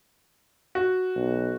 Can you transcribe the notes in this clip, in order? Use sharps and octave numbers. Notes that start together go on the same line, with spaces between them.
F#4
B1